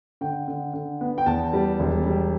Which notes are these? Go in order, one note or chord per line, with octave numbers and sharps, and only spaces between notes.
D3 G5
D3
D3
B3
G5
E2 A5
G3
E1
G3